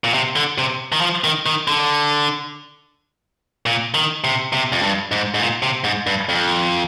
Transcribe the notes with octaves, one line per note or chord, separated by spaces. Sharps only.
A#2
C3
D3
C3
D#3
F3
D#3
D#3
D3
A#2
D#3
C3
C3
F2
G2
G#2
G#2
A#2
C3
G#2
G2
F2